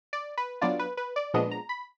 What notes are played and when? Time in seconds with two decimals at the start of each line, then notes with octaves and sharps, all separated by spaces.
0.13 D5
0.38 B4
0.61 F#3 B3 D4 F4 D5
0.79 B4
0.97 B4
1.16 D5
1.34 A#2 F3 G#3 B3 D4 D#5
1.51 A#5
1.69 B5